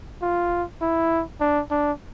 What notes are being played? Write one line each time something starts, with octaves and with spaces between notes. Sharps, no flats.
F4
E4
D4
D4